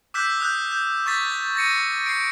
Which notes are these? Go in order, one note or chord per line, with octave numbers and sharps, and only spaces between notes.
D6 E6 F#6 G6 B6
D#6 F#6 G6
G6
C#6 G6 A6 B6
A6 A#6 C#7 D#7
C7 D7